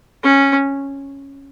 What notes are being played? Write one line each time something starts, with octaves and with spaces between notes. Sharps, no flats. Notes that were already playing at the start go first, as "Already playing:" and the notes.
C#4